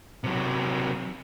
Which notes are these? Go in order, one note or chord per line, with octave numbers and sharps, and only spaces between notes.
C3 F#3